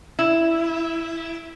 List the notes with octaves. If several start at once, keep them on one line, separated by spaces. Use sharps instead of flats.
E4